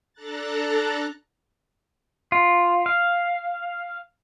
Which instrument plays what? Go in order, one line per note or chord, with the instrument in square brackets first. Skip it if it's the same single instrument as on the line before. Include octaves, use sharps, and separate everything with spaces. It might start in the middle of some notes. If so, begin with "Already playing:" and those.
[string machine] D4 A4 A#5 F#6 A6
[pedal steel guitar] F4
F5